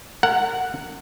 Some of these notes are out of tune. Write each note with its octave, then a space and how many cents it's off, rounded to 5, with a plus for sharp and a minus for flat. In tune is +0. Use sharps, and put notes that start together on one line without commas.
A#4 -30 F#5 +0